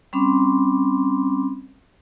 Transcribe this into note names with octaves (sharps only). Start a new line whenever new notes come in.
G3 C4 C#4 B5 C6 D6